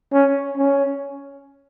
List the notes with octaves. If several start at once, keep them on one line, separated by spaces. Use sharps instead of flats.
C#4
C#4